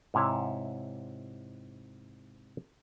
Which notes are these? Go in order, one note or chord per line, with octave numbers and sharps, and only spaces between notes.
G#2 C3 E4 C#5